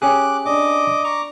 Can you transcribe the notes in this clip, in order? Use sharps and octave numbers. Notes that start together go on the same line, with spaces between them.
C#4 G4 G#4 D6 F#6
D4 D#5 D6
A#5 C#6 D6